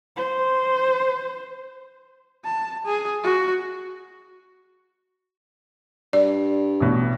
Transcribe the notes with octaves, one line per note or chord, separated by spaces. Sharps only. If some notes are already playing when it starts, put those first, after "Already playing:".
C5
A5
G#4
F#4
G2 D5
A1 B2